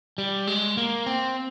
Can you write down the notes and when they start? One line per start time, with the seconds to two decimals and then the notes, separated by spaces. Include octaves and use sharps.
0.18 G3
0.47 G#3
0.77 A#3
1.06 C4